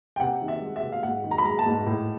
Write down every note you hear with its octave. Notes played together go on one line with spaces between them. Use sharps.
G5
C3 F#5
D#3
E5
G#3
E5
C3
F5
G#2 F#5
D#3
A#5
B5
G#3 A#5
A5
G#2
A2